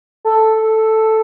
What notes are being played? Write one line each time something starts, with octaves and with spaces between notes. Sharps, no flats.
A4